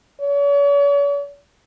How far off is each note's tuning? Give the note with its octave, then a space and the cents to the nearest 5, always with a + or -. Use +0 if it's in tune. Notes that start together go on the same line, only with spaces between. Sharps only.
C#5 +45